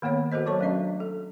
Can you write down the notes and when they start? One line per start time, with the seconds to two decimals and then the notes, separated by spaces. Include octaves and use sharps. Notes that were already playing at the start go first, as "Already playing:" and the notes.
0.02 D#3 A#3 B3 C#5 F#5
0.32 F#4 A4 A#4 C5 D#5
0.46 F#3 F#4 C#5 A5 C#6
0.60 F#3 A3 C#4 D4 D#5 E5
1.00 A4